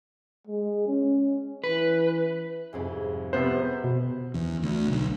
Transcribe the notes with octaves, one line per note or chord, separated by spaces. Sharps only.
G#3
C#4
E3 B4
C2 F2 G#2
C3 B3 C5 B5 F#6 G6
B2
E2
D2
B1